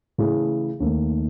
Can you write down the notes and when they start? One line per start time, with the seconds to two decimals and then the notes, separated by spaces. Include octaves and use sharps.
0.18 C#3 E3 A3 E4 G#4
0.80 D#2 D#3 A3